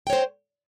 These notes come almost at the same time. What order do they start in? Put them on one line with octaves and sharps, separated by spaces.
G5 C#5 C5